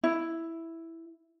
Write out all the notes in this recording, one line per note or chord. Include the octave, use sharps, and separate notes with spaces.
E4